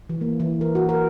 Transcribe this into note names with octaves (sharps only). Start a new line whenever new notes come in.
E3
A#3
E3
A#4
F#4
A#4